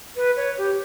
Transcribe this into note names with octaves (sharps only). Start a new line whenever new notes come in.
B4
C#5
G4